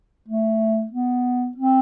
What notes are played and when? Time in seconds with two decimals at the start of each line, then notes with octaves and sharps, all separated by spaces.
0.28 A3
0.92 B3
1.57 C4